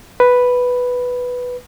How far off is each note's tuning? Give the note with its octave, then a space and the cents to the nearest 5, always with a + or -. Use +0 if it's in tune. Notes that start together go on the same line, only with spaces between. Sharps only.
B4 +0